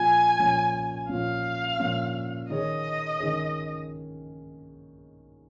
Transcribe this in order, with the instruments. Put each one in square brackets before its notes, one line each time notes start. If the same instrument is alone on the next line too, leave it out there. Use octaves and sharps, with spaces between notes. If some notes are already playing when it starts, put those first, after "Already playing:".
Already playing: [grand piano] A#2 F3 C#4 F4 [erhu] G#5
[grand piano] A#2 F3 C#4 F4
[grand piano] A#2 F3 C#4 F4 [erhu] F5
[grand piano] A#2 F3 C#4 F4
[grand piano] D#3 C#4 G#4 C#5 [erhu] D#5
[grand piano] D#3 C#4 G#4 C#5